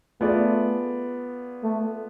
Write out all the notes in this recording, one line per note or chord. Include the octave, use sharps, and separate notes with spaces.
A3 B3 F4 G#4 D5
A3